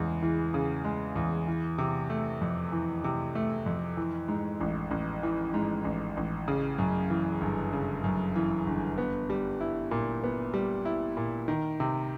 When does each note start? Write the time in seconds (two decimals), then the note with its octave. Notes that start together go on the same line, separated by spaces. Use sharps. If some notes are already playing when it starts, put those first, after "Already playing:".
Already playing: E2 C#3 G#3
0.23 E3
0.54 C#3
0.85 G#3
1.15 E2
1.47 E3
1.78 C3
2.10 A3
2.41 F2
2.72 E3
3.04 C3
3.35 A3
3.66 F2
3.97 E3
4.28 G#2
4.61 A1
4.91 A1
5.23 E3
5.54 G#2
5.85 A1
6.17 A1
6.48 C#3
6.78 F#2
7.10 E3
7.41 G1
7.73 C#3
8.04 F#2
8.36 E3
8.67 G1
8.98 B3
9.30 G3
9.61 E4
9.91 A#2
10.24 B3
10.54 G3
10.85 E4
11.17 A#2
11.48 D#3
11.80 C3